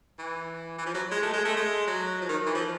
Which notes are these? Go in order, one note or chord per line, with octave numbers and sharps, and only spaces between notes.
E3
E3
F3
F#3
G#3
A3
G#3
A3
G#3
F#3
F3
D#3
E3
F3